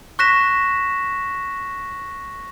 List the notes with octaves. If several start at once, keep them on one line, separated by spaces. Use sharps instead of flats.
C#6 F#6 A#6 B6 E7